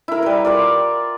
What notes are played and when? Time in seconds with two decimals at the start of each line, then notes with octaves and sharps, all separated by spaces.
0.08 E4 A#4
0.22 G3 B4
0.45 F4 A#4 D5